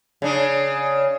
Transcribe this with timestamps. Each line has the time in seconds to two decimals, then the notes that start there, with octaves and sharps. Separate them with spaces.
0.22 C#3 D4